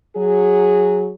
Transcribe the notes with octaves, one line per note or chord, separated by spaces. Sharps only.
F#3 G#4